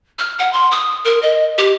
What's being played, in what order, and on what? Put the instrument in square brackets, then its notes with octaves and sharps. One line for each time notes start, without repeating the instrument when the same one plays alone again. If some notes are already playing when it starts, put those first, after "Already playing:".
[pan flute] F6
F#5
C6
D#6
A#4
D#5
G4